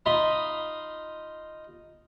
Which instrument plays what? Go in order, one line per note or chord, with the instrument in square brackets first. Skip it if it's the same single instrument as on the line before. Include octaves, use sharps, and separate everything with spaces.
[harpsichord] D#4 F4 D#5 B5 C6